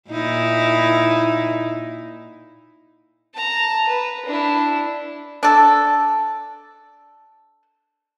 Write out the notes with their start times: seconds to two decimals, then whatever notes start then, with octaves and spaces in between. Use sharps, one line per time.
0.10 A#2 D#4 E4
3.35 A5 A#5
3.88 B4
4.26 D4 E4
5.43 D4 A4